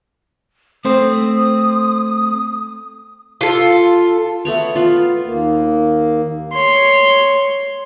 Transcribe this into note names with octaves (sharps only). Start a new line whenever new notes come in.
A3 C4 C5 D#6
F4 A4
A3 B3 C#5
B3 F4
D#2 A#3
C#5 C6